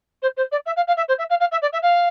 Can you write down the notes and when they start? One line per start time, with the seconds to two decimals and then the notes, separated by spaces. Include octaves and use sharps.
0.22 C5
0.37 C5
0.51 D5
0.66 E5
0.76 F5
0.87 F5
0.97 E5
1.08 C5
1.18 E5
1.30 F5
1.40 F5
1.51 E5
1.62 D5
1.72 E5
1.82 F5